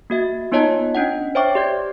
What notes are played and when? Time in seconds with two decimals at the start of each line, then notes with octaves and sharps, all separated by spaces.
0.10 A#3 F#4 E5
0.52 B3 D#4 F4 C#5 D#5 A5
0.95 C#4 D4 D#5 F#5
1.35 C5 C#5 E5 G5 C#6 D6
1.55 G4 D5 G#6